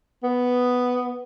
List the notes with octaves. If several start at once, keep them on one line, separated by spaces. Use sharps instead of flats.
B3